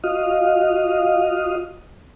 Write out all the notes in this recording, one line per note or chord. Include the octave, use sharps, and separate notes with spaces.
F4 F#4 D#5 F5